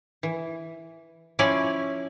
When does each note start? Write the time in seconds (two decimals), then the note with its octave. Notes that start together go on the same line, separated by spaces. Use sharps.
0.23 E3
1.39 F3 C#4 E4 C#5 D5 G#5